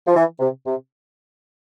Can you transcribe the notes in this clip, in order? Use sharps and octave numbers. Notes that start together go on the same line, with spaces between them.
F3
E3
C3
C3